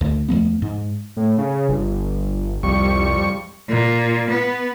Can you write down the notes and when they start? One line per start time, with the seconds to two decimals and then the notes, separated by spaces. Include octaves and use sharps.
0.01 D2
0.28 E2 F3 A3 B3
0.62 G#2
1.17 A2
1.38 C#3
1.69 G1
2.63 C2 F2 G3 C#6
3.68 A#2
4.30 B3